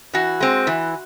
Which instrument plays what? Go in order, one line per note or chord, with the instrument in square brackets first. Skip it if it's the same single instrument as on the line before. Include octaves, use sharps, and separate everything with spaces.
[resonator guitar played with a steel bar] E3 F#4
G#3 C4
E3